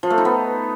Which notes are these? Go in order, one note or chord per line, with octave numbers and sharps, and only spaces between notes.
F3
A3
D#4
B3